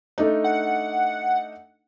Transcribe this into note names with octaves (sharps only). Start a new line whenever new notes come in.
A3 D4 D#4
F#5